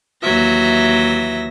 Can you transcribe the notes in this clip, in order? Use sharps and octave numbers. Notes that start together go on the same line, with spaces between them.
D#2 E3 F#3 E5 A#6